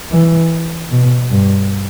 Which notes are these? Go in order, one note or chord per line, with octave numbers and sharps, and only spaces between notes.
E3
B2
G2